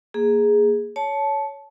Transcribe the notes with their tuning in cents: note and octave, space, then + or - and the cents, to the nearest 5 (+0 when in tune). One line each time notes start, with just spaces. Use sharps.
A#3 +0 G#4 +0
C#5 +15 A5 -15